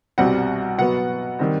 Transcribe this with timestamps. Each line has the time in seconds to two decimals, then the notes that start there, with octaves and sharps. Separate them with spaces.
0.18 C2 B2 G3 C4 F#5
0.79 B2 F#3 B3 F#5
1.39 D#3 G3 C4